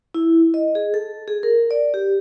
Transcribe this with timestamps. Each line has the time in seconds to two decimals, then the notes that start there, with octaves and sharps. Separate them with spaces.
0.14 E4
0.54 D#5
0.75 G#4
0.94 A4
1.28 G#4
1.43 A#4
1.71 D5
1.94 G4